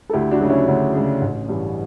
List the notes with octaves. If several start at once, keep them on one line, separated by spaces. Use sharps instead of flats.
A4
D2 E4 G4
D4 F#4
C#3 F#3
C#4 E4
D2 C#4
C#3 F#3
A1
G2 E3